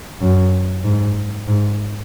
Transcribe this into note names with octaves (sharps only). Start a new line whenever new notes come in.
F#2
G#2
G#2